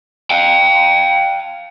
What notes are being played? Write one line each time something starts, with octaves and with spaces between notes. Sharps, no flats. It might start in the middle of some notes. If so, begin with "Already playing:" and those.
F5 G5